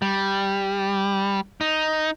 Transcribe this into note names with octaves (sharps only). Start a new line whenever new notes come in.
G3
D#4